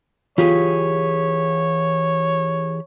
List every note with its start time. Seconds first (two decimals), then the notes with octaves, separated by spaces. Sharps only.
0.38 E3 F4 G4 G#4 C#5